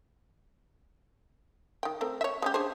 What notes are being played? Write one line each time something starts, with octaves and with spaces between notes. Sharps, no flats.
D#3 G5
A3 C4 A#4
C#5 E5
G#3 C#4 G4
D4 G#4 C5